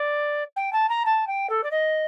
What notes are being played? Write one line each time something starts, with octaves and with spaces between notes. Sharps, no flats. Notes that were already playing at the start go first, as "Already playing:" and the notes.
Already playing: D5
G5
A5
A#5
A5
G5
A4
D5
D#5